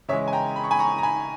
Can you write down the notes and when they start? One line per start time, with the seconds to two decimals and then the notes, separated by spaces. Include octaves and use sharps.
0.08 C#3 E3 G#3 C#5 E5
0.28 G#5
0.33 G5 A#5
0.56 B5
0.64 C#6
0.71 G#5 B5
0.79 A#5 C#6
0.98 A#5
1.03 G#5 B5